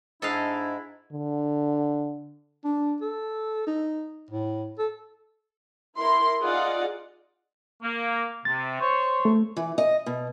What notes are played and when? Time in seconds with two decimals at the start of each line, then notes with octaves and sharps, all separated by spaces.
0.22 G#2 D4 E4 A4 D#5 F5
1.12 D3
2.64 D4
3.01 A4
3.67 D#4
4.31 A2
4.79 A4
5.99 E4 A#4 C6
6.44 D#4 F4 G#4 D5 F#5
7.83 A#3
8.45 C3 A6
8.80 C5 C#5 C#6
9.25 A3
9.57 E3
9.78 D#5
10.06 B2